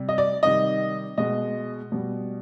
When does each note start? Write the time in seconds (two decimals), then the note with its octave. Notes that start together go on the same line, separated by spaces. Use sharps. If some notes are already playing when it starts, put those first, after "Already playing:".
Already playing: C3 G3
0.09 D#5
0.18 D5
0.43 C3 D#3 G3 D#5
1.18 B2 G#3 D#5
1.92 B2 G3